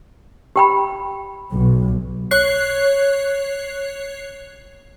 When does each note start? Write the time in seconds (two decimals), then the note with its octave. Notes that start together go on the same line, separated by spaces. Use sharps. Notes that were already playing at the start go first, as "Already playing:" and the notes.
0.56 G4 G5 B5
1.52 B1
2.31 C#5 F#6 C7